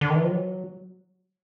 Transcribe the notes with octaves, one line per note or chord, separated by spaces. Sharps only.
D3
D#3
E3
F3
F#3